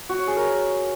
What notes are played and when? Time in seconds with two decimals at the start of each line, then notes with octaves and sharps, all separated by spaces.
0.09 F#4
0.18 C#5
0.27 G#4
0.36 A#4